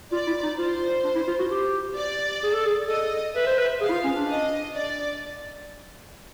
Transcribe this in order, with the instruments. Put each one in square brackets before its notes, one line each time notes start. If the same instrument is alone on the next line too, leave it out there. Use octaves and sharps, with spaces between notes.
[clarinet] F4 [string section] D5
[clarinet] E4
D#4
[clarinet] F4 [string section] C5
[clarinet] D4
E4
F4
F#4
G4
[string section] D5
[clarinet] G#4
A4
G#4
[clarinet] A4 [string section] D#5
[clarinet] B4 [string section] E5
[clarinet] C5
B4
[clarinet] G#4 [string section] F5
[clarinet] E4
F4
C#4
D4
[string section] D#5
D5